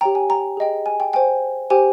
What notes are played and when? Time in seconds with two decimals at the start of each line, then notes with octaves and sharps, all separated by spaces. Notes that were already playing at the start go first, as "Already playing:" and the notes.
0.01 G4 C#5 G5 A#5
0.15 G#5
0.29 G5 A#5
0.57 G#4 D#5 G5
0.86 G#5
1.00 G5
1.13 C5 G5 G#5
1.70 G4 C5 G5 G#5